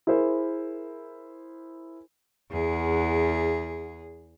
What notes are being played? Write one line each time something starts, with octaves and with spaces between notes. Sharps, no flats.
E4 G#4 A#4 C5
E2 G#4